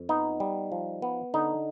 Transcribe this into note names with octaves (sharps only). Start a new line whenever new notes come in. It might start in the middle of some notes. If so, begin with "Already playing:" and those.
Already playing: F2
B3 D#4
G3
F3
B3
D3 D#4